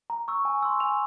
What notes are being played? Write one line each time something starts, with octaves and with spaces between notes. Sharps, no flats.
A#5
C#6 E6
G#5
C6 E6
G#5 F7